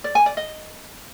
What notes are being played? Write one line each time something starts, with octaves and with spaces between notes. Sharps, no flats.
D5
G#5
D5
D#5